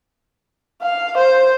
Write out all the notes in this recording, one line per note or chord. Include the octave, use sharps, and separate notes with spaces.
F5
C5